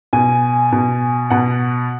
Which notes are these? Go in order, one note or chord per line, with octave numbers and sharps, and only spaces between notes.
B2 G#5
B2
B2 F#5